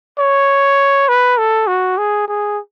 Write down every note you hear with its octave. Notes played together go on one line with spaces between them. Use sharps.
C#5
B4
A4
F#4
G#4
G#4